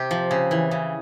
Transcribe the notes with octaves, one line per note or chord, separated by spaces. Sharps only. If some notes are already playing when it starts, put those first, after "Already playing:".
Already playing: C3 G4
F3
C#3
E3
C#3